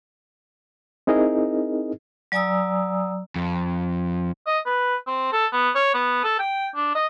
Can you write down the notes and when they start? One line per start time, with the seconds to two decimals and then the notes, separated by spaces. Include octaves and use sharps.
1.07 C4 D#4 E4 G#4 A#4 D#5
2.32 F#3 D5 G#5 A#5 D#6 E6
3.36 F2
4.47 D#5
4.66 B4
5.07 C4
5.33 A4
5.53 B3
5.75 C#5
5.94 B3
6.24 A4
6.39 G5
6.76 D4
6.95 D#5